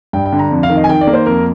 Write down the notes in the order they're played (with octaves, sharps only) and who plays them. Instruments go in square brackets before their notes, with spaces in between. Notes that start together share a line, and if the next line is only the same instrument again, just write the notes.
[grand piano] G2 G5
G5
D3
A#5
F2
F5
D#3
D#5
G#5
D#3 G5
D5
A#3
C5
F2 A#4